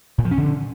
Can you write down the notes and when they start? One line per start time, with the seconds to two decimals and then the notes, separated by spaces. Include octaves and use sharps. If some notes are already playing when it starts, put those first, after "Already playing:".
0.18 A#2
0.25 F3
0.31 C#4
0.38 D3